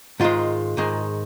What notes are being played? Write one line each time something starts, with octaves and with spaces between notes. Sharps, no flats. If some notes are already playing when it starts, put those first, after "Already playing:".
G#2 D#3 G#3 F4
G#2 D#3 G#3